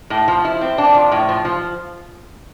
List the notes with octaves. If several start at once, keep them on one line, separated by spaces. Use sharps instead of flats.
A2
F3
E4
C4
D4
F3
A2
F3
F3